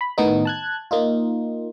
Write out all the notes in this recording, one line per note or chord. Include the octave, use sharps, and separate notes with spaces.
B5
A2 D#3 B3 D#4
A5 F#6 G#6
A#3 D#4 F4